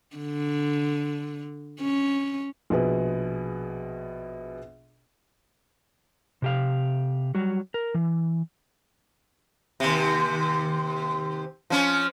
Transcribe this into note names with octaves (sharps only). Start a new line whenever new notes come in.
D3
C#4
A#1 B2 B3 G#4 B4
C3 G4 F5
F#3 G3 F#4
A#4
E3
D#2 C3
F3 C#4